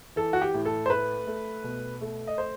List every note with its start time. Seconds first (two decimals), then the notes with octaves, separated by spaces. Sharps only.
0.16 E3 A4
0.33 F#4
0.42 G4
0.54 A2
0.65 A4
0.86 C5
0.90 A3 B4
1.27 A3
1.64 B2
2.01 A3
2.27 D#5
2.38 C5